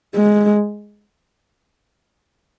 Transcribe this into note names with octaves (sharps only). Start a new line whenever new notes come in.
G#3